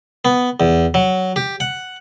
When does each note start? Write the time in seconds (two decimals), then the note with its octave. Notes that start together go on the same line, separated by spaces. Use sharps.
0.25 B3
0.60 E2
0.94 F#3
1.36 G4
1.60 F#5